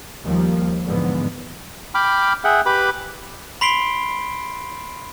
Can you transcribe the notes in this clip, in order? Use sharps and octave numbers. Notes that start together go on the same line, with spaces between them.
D#2 F3 G3 A#3
G#2 D3 E3 F3 G#3 B3
G5 B5 D6 F6
G#4 E5 F#5 G5
G4 B4 B5 D6
B5 C6 B6 C7 D7 G7